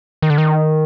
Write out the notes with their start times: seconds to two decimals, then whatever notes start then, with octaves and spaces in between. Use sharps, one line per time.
0.22 D#3
0.30 D3
0.38 D#3